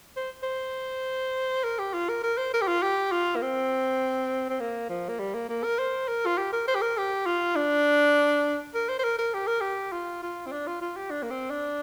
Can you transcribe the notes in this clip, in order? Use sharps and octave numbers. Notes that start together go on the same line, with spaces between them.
C5
C5
A#4
G4
F4
A#4
A#4
C5
A#4
G4
F4
G4
F4
A#3
C4
C4
A#3
F3
A#3
G3
A#3
A#3
A#4
C5
A#4
F4
G4
A#4
C5
G4
A#4
G4
F4
D4
A#4
C5
C5
A#4
A#4
G4
A#4
G4
F4
F4
C4
D4
F4
F4
G4
D4
A#3
C4
D4